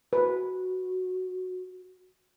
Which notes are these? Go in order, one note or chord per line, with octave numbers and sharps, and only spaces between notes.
F#4 B4